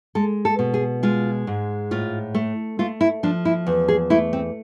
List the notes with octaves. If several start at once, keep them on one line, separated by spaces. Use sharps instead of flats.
G#3 A4
A4
B2
G#4
G#3 F4
G#2
A2 F4
A3
A3 F4
E4
F3 D4
E4
E2
G#4
A3 E4
C4